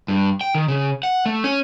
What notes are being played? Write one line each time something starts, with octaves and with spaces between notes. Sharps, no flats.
G2
G5
D#3
C#3
F#5
A3
C#4